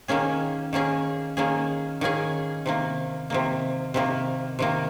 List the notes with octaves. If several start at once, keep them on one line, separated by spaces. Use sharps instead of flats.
D#3 A#3 C#4 G#4
D#3 A#3 C#4 G#4
D#3 A#3 C#4 G#4
D#3 A#3 C#4 G#4
C3 D#3 A#3
C3 D#3 A#3
C3 D#3 A#3
C3 D#3 A#3